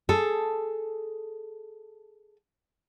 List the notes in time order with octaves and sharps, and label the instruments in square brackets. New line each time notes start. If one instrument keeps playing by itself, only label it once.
[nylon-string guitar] G#4 A4